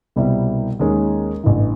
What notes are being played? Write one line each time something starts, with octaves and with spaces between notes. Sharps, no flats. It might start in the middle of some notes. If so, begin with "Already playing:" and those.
C2 B2 G3 C4 E4
D#2 D#3 G#3 C#4
A1 G2 E3